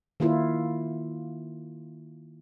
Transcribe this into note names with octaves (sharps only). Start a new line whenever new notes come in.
D#3 A#3 E4 F4